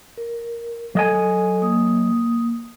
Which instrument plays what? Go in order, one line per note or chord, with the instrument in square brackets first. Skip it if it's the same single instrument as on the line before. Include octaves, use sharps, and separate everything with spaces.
[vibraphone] A#4
[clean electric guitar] F#3 D#5 G#5 [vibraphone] A4
[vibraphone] A#3 D#6